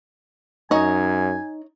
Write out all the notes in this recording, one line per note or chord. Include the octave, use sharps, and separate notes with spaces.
F#2 D#4 C#5 D#5 G#5